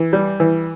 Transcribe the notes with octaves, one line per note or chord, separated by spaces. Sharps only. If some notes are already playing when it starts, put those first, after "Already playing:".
Already playing: E3
G3
E3